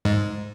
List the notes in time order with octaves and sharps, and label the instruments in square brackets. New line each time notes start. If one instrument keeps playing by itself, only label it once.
[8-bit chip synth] G#2